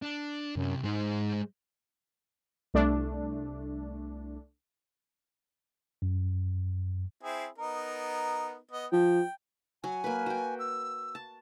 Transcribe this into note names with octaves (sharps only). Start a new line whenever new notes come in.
D4
C2 F#2 C3
G#2 G#3 C5
C2 A3 D4
F#2
C4 E4 G#4
B3 D#4 A#4
B3 D#5
F3 G5
F#3 G#5
A#3 B4
F#4 G5
E6
A5